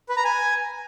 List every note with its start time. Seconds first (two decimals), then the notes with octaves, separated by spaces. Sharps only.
0.09 B4
0.17 A#5
0.24 G#5